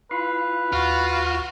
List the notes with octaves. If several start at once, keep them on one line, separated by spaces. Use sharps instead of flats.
E4 F4 B4 F5
D#2 F4 F#4 F6